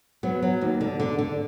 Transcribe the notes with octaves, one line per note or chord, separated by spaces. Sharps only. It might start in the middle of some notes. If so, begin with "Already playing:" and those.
F#3 B3
F#3
D#2
D3
D3
D3